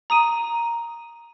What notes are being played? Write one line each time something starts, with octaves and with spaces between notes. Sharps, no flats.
A#5 D#6 D#7